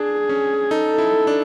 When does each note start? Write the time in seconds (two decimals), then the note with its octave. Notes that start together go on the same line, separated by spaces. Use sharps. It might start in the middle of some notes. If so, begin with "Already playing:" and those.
Already playing: D4 G#4
0.29 C#4
0.71 D#4 A4
0.98 E4
1.27 D4